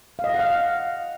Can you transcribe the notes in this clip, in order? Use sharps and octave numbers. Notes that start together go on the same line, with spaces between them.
F5
D#5
F5
F#5
F5